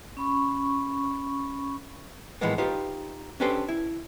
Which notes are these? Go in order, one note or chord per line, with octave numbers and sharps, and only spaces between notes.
C#4 B5 C#6
A2 E3 F3 G#3 A#3 B3
D#4 F4 G4 B4
C#4 D4 G4 A4 B4 C5
E4